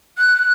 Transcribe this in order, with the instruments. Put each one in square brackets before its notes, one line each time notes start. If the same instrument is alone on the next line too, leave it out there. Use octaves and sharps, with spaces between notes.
[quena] F#6